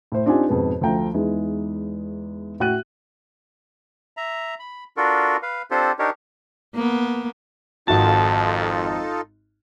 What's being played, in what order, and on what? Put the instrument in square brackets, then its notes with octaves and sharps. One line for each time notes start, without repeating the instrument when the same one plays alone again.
[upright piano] A2 C5
C4 D4 D#4 F4 G4 G#5
F2 G#2 B2 B3
D2 F3 A4 G5 A#5
E2 G#3 D#4 E4
A2 F#4 G5 F#6 D#7
[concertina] E5 A#5
B5
D4 F4 F#4 A4 A#4
B4 F5
C4 D4 F4 G4 A4 C5
D4 D#4 G4 A#4 C#5
[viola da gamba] A#3 B3
[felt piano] G#1 F#4 [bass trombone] F2 [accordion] D#4 F4 A4 [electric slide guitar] A5